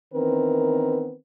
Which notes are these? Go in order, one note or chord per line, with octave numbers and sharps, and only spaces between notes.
D#3 E3 B3 C4 A#4 B4